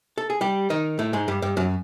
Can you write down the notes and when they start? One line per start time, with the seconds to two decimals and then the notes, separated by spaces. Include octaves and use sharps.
0.18 A4
0.30 G#4
0.41 G3 G4
0.70 D#3 D#4
0.99 A2 A3
1.13 G#2 G#3
1.28 G2 G3
1.42 G2 G3
1.57 F#2 F#3